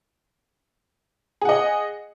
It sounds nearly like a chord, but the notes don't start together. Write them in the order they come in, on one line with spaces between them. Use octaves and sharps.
G#4 F#5 D#5